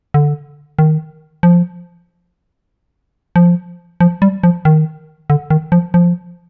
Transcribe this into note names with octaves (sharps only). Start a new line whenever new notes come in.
D3
D#3
F3
F3
F3
G3
F3
D#3
D3
D#3
F3
F3